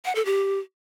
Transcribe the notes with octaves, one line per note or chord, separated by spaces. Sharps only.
F#5
A4
G4